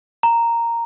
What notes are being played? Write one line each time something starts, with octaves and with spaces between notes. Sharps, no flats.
A#5